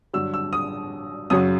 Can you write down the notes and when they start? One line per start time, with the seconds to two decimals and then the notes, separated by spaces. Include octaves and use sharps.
0.13 G2 D3 F#3 E6
0.34 E6
0.53 D#6
1.30 F#2 C#3 F#3 D#6